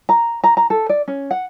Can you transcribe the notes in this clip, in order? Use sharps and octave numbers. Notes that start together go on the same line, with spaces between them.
A#5
A#5
A#5
A4
D5
C#4
F#5